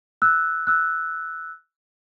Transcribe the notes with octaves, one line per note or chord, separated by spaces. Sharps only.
E6 F#6
E6 F#6